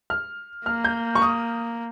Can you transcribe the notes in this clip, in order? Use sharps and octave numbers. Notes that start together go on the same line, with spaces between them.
F6
A#3 F6
G6
C#6
D#6